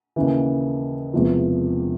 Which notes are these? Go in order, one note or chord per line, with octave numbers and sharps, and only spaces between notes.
D#2 C#3 E3
E1 E2 C3 F3